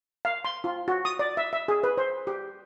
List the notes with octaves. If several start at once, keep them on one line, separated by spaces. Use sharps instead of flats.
F5
C6
F4
F#4
D#6
D5
E5
E5
G#4
B4
C5
G4